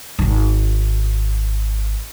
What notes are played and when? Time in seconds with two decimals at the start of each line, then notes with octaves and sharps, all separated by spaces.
0.19 D1 G#1